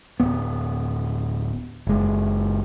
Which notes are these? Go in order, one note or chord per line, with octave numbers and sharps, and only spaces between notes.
D1 B3
F#1 G#3